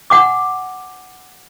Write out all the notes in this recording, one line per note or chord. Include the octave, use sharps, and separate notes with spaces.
F#5 G#5 D6